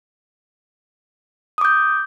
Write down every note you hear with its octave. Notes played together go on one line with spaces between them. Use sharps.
D6 D#6 G6